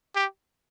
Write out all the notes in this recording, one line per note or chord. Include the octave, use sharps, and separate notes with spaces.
G4